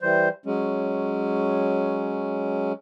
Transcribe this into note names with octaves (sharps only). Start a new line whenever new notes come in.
E3 G3 C5
F#3 G#3 C#4